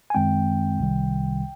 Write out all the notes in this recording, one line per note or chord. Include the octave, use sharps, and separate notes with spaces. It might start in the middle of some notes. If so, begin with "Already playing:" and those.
G#5
F#2 D#3 G#3 C4 G5
C2 C3 D#3 G3